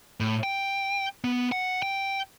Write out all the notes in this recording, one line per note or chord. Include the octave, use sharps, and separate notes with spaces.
A2
G5
B3
F#5
G5